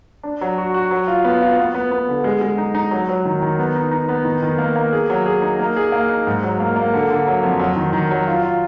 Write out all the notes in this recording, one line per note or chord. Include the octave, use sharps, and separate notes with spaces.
D4
F#3
F#4
F#4
F#3
F4
B3
F4
B3
B3
B3
D3
G#3
G#3
D#4
D#4
F#3
F#3
D#3
D#3
B3
D#4
D#4
B3
D#3
D#3
A#3
A#3
G#4
F#3
G#4
D#4
A#3
G#4
A#3
D#4
G#2
F#3
A#3
A#3
D3
D3
F#3
F2
F#3
D#3
D#3
F#3
F4
F4